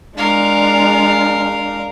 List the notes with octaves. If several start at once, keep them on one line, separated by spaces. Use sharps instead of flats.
G#3 D4 A#4 F5